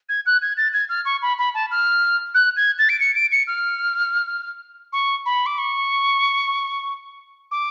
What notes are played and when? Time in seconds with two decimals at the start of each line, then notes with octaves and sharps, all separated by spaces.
0.09 G#6
0.26 F#6
0.42 G#6
0.57 A6
0.73 G#6
0.89 F6
1.05 C#6
1.22 B5
1.38 B5
1.54 A5
1.71 F6
2.34 F#6
2.57 G#6
2.79 A6
2.89 D7
3.00 C#7
3.15 D7
3.32 C#7
3.47 F6
4.93 C#6
5.26 B5
5.46 D6
5.58 C#6
7.51 D6